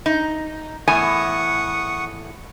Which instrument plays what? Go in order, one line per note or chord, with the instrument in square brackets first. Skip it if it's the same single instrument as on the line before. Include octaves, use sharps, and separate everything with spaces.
[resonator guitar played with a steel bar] D#4
[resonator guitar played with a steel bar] E2 A2 G#5 [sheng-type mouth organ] F#5 C#6 D#6